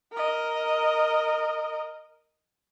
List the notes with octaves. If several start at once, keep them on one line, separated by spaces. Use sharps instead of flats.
A#4 D#5